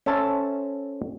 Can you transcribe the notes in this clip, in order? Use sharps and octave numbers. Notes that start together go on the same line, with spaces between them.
C#4 A4 C5 E5 A5